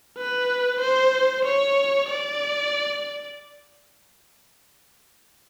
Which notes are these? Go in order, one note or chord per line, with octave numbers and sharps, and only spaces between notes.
B4
C5
C#5
D5